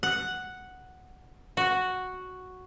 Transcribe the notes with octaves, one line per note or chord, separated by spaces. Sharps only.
F#5
F#4